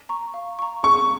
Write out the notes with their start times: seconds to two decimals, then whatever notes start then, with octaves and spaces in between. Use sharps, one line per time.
0.09 A#5 C#6
0.34 F5
0.59 A#5 C#6
0.83 G#4 C#6